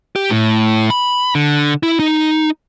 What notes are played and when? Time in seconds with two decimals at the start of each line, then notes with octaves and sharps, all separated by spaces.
0.16 G4
0.30 A2
0.90 B5
1.35 D3
1.83 E4
1.99 D#4